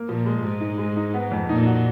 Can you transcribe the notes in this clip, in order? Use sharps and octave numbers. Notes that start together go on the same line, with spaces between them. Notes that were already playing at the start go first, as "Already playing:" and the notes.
Already playing: A#3
A#2 F3
G#3
G#2 G#3
D#4
G#3
D#4
B3
F2
A#2 D#4
F#4